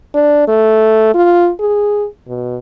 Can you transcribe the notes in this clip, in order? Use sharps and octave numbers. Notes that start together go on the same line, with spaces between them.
D4
A3
F4
G#4
B2